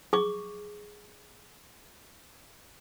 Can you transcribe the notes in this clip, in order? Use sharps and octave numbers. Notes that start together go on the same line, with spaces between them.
G#4 C#6 D6